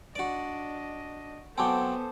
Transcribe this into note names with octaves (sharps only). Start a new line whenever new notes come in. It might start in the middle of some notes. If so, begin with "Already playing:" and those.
D4 F#4 D5 D#5
F#3 B3 C4 A4 C5 G#5 A5 D6